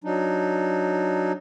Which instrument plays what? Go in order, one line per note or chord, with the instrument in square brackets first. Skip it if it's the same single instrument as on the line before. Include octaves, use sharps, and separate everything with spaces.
[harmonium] F#3 D4 D#4